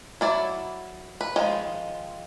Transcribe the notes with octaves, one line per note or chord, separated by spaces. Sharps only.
F#3 E4 D5
B4
D#3 F3 G#3